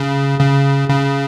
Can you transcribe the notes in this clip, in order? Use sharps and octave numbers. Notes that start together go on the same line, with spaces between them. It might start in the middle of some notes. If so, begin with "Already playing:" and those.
Already playing: C#3
C#3
C#3